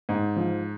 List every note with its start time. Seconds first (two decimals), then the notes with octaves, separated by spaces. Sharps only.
0.09 G#2
0.36 F3